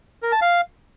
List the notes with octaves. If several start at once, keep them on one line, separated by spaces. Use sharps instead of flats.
A#4
A5
F5